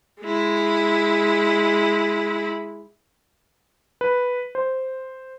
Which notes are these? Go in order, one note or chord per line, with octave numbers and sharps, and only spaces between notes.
G#3 E4
B4
C5